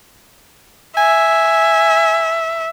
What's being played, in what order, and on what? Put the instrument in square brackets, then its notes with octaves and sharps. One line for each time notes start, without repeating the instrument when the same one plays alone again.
[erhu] E5 [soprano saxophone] G#5